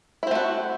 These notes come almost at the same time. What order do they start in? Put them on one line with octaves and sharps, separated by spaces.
E4 C4 A3 F#4